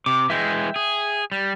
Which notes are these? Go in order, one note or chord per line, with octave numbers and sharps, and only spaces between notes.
C3 D6
E3 G#3 E5 G5
G#4
G3